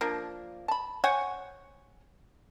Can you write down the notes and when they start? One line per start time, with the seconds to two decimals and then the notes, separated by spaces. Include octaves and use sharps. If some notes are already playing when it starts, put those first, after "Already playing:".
0.01 F3 A#3 D4
0.68 A5 B5
1.04 C5 C#5 F#5 G#5